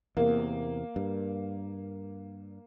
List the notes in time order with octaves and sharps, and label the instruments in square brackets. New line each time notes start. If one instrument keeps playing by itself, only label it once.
[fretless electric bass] E2 C3 [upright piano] A#3
[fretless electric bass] G2